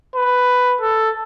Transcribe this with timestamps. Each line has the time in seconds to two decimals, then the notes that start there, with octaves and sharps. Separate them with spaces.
0.15 B4
0.81 A4